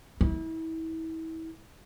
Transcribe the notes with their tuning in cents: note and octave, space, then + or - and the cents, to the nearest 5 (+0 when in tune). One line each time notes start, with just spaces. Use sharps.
E4 -35